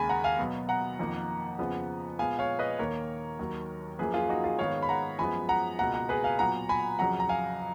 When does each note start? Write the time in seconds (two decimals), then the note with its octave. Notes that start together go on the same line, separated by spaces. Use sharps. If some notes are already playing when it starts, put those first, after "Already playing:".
Already playing: D#2 C#3 G#3 G#5 B5
0.09 F#5 A#5
0.24 F5 G#5
0.39 B2 F#3 B3
0.69 F#5 A#5
0.99 F2 D#3 A#3
1.59 F2 C#3 F3 B3
2.19 A#2 G#3 B3 F5 G#5
2.39 C#5 F5
2.59 B4 D#5
2.79 D#2 D#3 A#3 A#4 C#5
3.39 D#2 D#3 F#3
3.99 F#2 F3 A#3 G#4 B4
4.14 F4 G#4
4.29 D#4 F#4
4.44 F4 G#4
4.59 G#2 D#3 G#3 B3 C#5 F5
4.83 B5
4.89 F#5 A#5
5.19 F#2 F3 G#3 B3 G#5 B5
5.49 F#5 A#5
5.79 C#2 B2 A#3 F#5 A#5
5.94 F#5 A#5
6.09 G#4 B4
6.24 F5 G#5
6.39 A#2 F#3 B3 F#5 A#5
6.69 G#5 B5
6.99 F2 C#3 F#3 F#5 A#5
7.20 A#5
7.29 F5 G#5